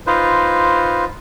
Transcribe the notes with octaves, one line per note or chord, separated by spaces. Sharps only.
D#4 F4 B4 C5